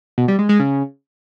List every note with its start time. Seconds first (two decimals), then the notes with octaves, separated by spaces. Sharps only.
0.18 B2
0.28 G3
0.39 G#3
0.49 G#3
0.60 C#3